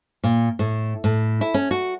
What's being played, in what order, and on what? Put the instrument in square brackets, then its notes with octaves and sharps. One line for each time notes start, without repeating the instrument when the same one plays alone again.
[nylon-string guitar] A#2
A2
A2
E4
C#4
F#4